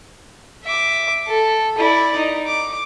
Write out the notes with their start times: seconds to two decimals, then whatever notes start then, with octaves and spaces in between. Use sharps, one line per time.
0.65 E5 D6
1.27 A4
1.78 E4 D5
2.16 D#4
2.47 D6